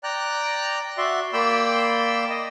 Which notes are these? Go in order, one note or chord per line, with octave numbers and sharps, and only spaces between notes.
D5 G5 A#5 F#6
F#4 D5 E5 C6
A#3 D5 G5 B5 C6 E6
D#5